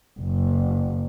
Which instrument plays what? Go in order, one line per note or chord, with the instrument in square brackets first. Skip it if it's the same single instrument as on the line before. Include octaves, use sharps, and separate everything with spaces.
[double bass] F#1